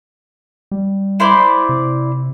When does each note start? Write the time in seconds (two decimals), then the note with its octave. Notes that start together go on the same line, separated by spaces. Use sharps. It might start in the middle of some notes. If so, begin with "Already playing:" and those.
0.71 G3
1.20 E4 C5 D5
1.69 C3